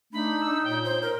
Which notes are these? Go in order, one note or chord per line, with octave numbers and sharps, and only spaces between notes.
A3 D4 D#4 B5
E6
A#2 C#5 G5
C5
A#4